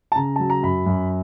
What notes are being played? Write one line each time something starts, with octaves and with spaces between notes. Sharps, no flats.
A5
C#3 A#5
F#3 A5
A#5
F#2 B5
F#2